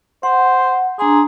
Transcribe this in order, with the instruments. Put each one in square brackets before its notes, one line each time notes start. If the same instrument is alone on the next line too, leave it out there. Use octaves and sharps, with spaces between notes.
[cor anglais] C5 [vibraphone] F#5
[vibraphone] D4 A#5 C6 [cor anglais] G#4